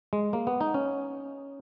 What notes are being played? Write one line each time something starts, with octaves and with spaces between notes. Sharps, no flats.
G#3
A#3
B3
D#4
C#4